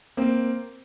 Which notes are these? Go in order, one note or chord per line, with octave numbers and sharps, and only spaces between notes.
A#3 C4